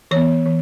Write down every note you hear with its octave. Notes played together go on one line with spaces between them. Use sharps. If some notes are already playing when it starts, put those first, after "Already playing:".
E3 B3 C#5
E3